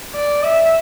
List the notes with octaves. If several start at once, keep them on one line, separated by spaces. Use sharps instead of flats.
D5
E5